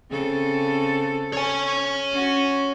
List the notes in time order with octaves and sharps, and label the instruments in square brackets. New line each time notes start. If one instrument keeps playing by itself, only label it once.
[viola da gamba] C#3 C4 A4
[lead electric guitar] C#5 G#5
[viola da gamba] C#4 F#4